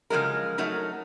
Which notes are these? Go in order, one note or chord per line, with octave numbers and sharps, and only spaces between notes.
C#3 F3 F#3 G#3 A#4
F#3 A3 D#4 A#4